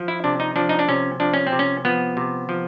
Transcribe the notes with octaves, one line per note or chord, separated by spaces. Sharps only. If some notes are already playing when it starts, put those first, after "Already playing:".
Already playing: F3
E4
C3 D4
D#4
F3 D4
D#4
D4
C3 C#4
F3 D4
C#4
C4
C3
C#4
F3 B3
C3
F3